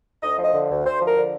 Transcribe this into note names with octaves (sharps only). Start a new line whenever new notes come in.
D2 D#5
F3
D#5
D3
D2
D2 C5
F3
A#4
D3